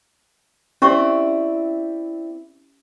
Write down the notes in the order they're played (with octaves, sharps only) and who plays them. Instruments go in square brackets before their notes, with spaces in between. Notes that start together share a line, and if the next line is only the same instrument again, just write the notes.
[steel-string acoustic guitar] C4 E4 D5 [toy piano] C#4 G4 C#6